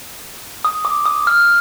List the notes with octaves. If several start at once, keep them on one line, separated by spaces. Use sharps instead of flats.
D#6
D6
D#6
F6